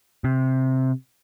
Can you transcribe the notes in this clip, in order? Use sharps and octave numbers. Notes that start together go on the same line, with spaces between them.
C3